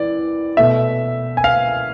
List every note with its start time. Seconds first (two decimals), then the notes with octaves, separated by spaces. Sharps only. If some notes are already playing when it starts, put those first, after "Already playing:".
Already playing: E3 D5
0.57 B2 A3 E5
1.37 G#5
1.44 F5